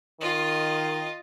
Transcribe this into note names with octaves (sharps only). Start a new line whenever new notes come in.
D#3 F4 D#5